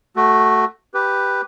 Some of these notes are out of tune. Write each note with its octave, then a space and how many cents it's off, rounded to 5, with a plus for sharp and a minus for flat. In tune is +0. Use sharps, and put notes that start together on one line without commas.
A3 +0 F#4 +10
G4 +0 B4 +0